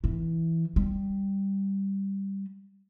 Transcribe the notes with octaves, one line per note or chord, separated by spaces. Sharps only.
E3
G3